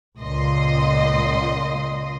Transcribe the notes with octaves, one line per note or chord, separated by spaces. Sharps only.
C#2 A#2 D#5 C6